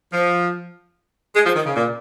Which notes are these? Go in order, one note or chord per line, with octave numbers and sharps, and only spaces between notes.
F3
G#3
F3
D#3
C#3
A#2